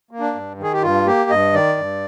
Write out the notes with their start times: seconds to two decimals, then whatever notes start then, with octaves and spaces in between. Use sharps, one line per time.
0.11 A#3
0.20 D4
0.35 G2
0.58 D#3 G#4
0.73 G4
0.82 G2 F4
1.06 A#3 G4
1.30 G2 D#5
1.53 D#3 D5
1.77 G2